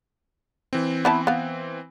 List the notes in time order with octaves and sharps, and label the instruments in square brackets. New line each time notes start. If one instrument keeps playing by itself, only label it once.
[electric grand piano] E3 C4
[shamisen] B3 E4 A5
B3 F5